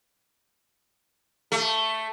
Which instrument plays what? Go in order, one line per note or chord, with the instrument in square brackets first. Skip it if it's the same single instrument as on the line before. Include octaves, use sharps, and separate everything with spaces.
[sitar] A3